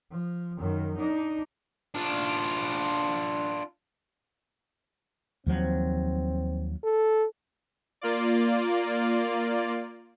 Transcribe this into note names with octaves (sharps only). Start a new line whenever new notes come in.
F3
F#2 D#3
D4 D#4
D4 F4
D#2 F3 F#3 C4
A4
A#3 F4 D5